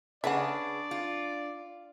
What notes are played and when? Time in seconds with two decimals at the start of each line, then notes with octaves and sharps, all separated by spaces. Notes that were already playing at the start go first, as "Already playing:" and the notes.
0.24 C#3 D4 G#4 B4 D5 E5 F#5
0.91 F4